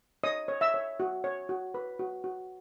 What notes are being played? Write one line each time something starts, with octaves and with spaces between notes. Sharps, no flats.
C#5 D#5 D#6
C#5
E5 E6
C#5
F#4
C#5
F#4
B4
F#4
F#4